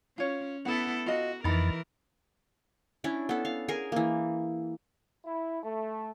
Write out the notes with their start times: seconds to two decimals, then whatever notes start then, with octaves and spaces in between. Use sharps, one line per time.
0.18 C#4 F4 C#5
0.65 B3 E4 A4 F#5
1.06 F4 F#4 D#5
1.44 F2 E3 D#4 A#4 B5 A6
3.04 C#4 D4 E4
3.29 B3 A4
3.45 F5
3.68 G#4 A#4 G#5
3.92 E3 A#3
5.24 E4
5.63 A3